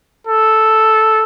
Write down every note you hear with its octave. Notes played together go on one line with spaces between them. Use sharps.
A4